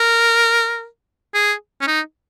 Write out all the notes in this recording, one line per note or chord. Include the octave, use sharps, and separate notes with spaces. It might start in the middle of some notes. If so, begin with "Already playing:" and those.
Already playing: A#4
G#4
C#4
D#4